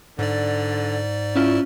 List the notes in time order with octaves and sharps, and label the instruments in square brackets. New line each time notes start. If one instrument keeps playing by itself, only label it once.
[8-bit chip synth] G#2 D5 [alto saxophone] D3
[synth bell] C#4 F4 [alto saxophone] E4